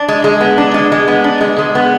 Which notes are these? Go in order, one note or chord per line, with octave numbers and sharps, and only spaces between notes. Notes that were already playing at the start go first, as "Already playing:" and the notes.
Already playing: D4
G#3
G#3
B3
D4
G#3
G#3
B3
D4
G#3
G#3
B3